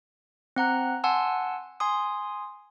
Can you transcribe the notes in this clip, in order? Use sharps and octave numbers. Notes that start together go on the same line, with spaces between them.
C4 F#5 A#5 F#6
F#5 G#5 A5 C6 E6
G#5 C6 D#6